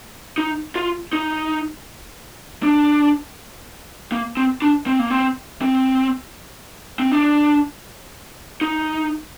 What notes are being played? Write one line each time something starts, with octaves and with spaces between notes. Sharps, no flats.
D#4
F4
D#4
D4
A#3
C4
D4
C4
A#3
C4
C4
C4
D4
D#4